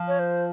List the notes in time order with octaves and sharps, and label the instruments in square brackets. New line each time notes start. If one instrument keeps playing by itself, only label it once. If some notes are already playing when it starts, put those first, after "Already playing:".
Already playing: [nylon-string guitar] F3
[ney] C#5
C5